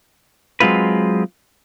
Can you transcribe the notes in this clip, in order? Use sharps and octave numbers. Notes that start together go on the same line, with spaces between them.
F#3 G#3 C4 F4 B4